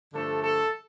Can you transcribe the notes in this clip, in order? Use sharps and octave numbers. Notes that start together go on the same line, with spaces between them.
G2 D3 F3 A3 A4
A4